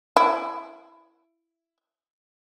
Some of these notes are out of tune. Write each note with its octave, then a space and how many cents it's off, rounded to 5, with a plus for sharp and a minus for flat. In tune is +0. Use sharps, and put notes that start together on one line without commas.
E4 +15